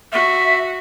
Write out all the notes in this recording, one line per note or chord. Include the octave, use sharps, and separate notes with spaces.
F#4 E5